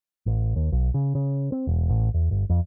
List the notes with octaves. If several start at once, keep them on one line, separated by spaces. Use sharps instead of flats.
A1
D#2
B1
C#3
C#3
C4
E1
A1
E2
G1
F2